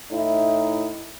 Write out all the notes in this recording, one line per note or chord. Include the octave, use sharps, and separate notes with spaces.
A2 D#4 E4